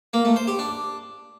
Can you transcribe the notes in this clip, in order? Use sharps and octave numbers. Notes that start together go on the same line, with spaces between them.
A#3
A3
C5
G4
D4